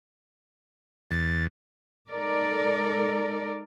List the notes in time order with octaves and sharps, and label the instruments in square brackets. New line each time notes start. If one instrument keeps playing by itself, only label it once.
[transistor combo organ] E2 [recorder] A6
[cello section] G#3 D#4 A4 A#4 D5